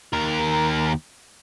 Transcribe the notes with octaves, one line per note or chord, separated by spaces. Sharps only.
D#2 A#4